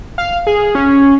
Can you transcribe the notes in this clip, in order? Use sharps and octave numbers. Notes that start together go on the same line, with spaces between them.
F5
G#4
C#4